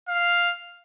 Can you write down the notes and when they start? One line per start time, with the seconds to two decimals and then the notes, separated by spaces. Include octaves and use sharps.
0.08 F5